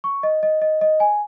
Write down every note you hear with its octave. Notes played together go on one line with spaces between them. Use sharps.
C#6
D#5
D#5
D#5
D#5
G#5